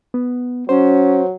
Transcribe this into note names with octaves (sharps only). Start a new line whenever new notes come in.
B3
F#3 C#4 C5